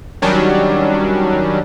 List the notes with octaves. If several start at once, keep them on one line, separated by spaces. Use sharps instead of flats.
D#3 F#3 G3 C#4 D4